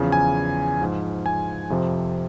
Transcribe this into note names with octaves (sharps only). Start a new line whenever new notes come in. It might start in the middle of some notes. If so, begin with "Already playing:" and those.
Already playing: E2 C#3 F3
G#5
G#2 F3
G#5
F2 C3 F3